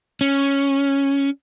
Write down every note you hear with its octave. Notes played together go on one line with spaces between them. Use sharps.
C#4